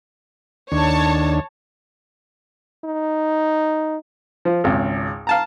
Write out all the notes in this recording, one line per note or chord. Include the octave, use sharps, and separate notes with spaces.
D#2 D4 C#5 A5
D#4
F3
G#1 C#2
F5 A5 A#5